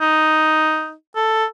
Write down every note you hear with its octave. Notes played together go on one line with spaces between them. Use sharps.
D#4
A4